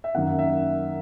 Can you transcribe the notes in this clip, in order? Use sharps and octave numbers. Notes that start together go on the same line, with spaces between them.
E5
F#2 D#3 A#3 F#5
E5